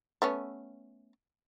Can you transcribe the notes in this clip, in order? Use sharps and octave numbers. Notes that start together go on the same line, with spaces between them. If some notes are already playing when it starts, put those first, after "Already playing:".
A3 B3 C#4